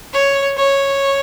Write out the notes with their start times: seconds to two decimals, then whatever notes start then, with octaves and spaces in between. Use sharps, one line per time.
0.13 C#5
0.57 C#5